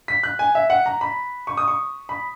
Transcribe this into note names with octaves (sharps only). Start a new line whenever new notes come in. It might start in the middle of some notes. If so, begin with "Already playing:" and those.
B6
F#6
G#5
E5
F#5
A#5
B5
C#6
D#6
C#6
B5